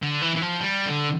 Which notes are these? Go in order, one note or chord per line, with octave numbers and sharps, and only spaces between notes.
D3
E3
E3
F3
G3
D3